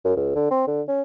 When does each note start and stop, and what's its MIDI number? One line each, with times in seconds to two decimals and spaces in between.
0.05 0.14 42
0.16 0.31 37
0.35 0.46 50
0.51 0.63 60
0.67 0.82 50
0.88 1.02 61